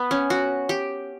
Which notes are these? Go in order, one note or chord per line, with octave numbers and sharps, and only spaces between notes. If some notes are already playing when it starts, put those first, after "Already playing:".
Already playing: B3
C#4
F#4
G4